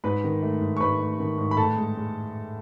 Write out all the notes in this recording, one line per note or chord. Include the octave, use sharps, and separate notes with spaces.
G#2 B4 B5
D#3
A3
G#2
C#6
G#2 B4 B5
A3
D#3
G#2
B5
A2 A4 A5
G#3
G#3